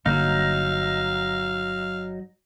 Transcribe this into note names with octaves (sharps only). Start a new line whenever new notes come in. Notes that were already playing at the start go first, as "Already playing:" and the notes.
G1 D3 F#3 A#3 D#4 F5